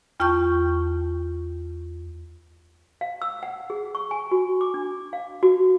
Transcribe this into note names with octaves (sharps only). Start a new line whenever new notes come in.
E2 F4 G5 A5 C#6 G6
F5
E6
F#5
G#4
C#6
G#5
F#4
D6
D4
F5
F#4